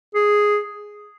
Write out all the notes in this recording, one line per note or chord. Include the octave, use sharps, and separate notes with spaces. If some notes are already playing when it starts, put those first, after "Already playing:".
G#4